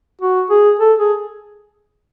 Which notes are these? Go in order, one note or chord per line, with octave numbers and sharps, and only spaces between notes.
F#4
G#4
A4
G#4